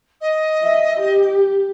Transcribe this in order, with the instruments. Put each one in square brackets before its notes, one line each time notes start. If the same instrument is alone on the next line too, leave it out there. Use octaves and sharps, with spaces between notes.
[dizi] D#5
[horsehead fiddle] E5
G4